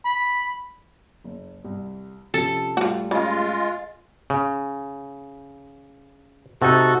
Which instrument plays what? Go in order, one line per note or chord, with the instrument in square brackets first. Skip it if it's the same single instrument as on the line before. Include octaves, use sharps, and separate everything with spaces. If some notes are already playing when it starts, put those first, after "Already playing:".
[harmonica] B5
[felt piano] F#1
C2
[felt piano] C3 F3 C#4 [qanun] A4
[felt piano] A2 G3 [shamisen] F4 F#4
[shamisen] C#3 [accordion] G#3 F4
[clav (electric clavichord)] C#3
[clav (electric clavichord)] C3 D#4 [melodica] F#4 A4